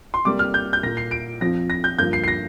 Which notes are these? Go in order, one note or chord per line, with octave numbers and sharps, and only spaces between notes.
C6
C3 G3 A#3 D6
F6
G6
G6
A#2 A#3 A#6
C7
D7
F2 F3 C4 A#6
A#6
G6
G2 D3 F3 A#3 G6
C7
C7
A#6